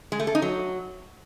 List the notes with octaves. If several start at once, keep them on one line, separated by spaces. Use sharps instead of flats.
G#3
A3
A4
D#4
F#3